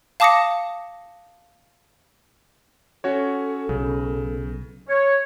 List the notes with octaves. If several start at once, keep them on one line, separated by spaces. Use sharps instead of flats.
F5 A5 D6 D#6 A#6 C#7
C#4 F#4 A4 C#5
B1 C#3
C#5